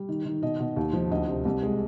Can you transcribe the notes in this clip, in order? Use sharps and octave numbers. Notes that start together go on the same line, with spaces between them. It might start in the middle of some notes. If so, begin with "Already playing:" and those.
Already playing: G3
D#3
D#3
B2 D#5
B2
D#2
F3
D2 D#5
C3
C2
G#3